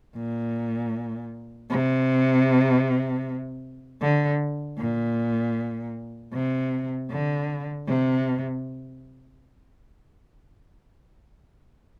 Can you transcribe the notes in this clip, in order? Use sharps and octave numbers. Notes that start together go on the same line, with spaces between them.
A#2
C3
D3
A#2
C3
D3
C3